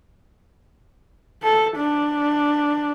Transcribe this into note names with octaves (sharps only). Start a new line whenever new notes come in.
A4
D4